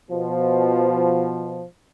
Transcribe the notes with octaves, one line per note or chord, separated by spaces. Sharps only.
B2 F3